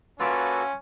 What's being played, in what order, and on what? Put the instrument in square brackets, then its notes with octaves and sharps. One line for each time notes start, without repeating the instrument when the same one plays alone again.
[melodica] A#3 F#4 A4 [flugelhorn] C#4 [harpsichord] F4 D5 E5 [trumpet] B4